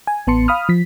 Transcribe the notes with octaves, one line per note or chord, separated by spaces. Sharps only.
G#5
A1 B3 A5 C6 C#7
F5 B5 D#6 F6
F3 B6